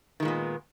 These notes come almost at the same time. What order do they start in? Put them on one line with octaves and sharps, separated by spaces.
D#3 G#3 A#2 B3